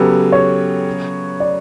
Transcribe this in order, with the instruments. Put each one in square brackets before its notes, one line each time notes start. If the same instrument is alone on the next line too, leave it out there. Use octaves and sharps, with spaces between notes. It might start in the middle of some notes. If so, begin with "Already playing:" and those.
Already playing: [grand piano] C#3 F#3 B3 [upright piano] G4 A4
[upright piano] C#5
D5